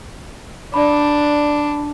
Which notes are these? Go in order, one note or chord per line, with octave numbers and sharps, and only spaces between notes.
D4 D5 B5